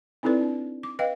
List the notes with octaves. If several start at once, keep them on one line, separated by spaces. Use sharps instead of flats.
C4 D#4 E4 A4 B4 D5
D4
D6
B4 D#5 F5 G5